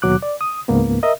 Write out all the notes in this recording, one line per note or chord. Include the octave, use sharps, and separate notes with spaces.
D#2 B2 F#3 D6 F#6
D5
D#6
C#2 G#2 A#3 B3
A#4 D#5 E5